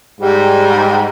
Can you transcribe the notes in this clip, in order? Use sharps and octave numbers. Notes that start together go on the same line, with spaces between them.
G#2 G3